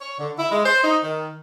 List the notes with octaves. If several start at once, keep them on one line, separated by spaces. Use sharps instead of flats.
C#5
D3
E4
G#3
C5
D#4
D#3